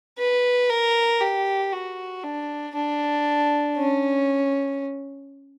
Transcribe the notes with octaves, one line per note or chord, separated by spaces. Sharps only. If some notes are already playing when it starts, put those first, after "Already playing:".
B4
A#4
G4
F#4
D4
D4
C#4